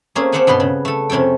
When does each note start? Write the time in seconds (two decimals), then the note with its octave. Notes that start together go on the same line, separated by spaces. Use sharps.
0.15 A3 A#3 C4 C#4 G#4
0.32 G4 A4 C5 F5 F#5 G#5
0.47 G2 B2 B3 B4 C6
0.60 C#3
0.85 A3 A4
1.10 F2 C3 C#4 A4 G5